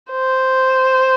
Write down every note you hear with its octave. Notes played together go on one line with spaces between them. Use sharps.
C5